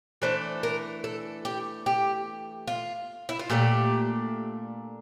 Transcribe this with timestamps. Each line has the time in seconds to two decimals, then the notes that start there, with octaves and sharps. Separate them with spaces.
0.22 E3 A3 D4 C5
0.63 A#4
1.04 A4
1.45 G4
1.86 G4
2.67 F4
3.29 E4
3.39 F4
3.50 A#2 A3 D4 G4